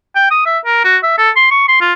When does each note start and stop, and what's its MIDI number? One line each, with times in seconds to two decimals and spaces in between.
0.16 0.29 79
0.31 0.42 87
0.46 0.58 76
0.66 0.84 70
0.84 0.97 66
1.03 1.13 76
1.18 1.30 69
1.36 1.50 84
1.51 1.67 85
1.68 1.79 84
1.81 1.93 65